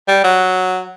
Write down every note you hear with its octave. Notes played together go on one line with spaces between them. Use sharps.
G3
F#3